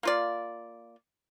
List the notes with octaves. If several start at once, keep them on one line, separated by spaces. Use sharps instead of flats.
A#3 F4 D5